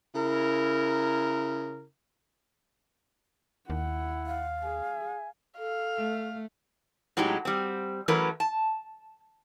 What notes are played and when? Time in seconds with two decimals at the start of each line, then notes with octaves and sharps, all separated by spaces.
0.15 C#3 E4 A#4
3.70 D#2 E4 F#5
4.26 F5
4.63 G#4 G#5
5.58 A4 F5
5.97 A3
7.17 A2 F#3 G#3 C#4 D#4 G4
7.45 G3 C4
8.08 E3 F#3 A3 C#4 A#4 B4
8.40 A5